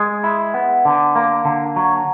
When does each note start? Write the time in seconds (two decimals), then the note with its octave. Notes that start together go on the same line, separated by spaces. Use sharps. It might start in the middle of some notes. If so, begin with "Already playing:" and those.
Already playing: G#3
0.24 E4
0.54 B3
0.85 D3
1.15 A#3
1.45 D3
1.76 F#3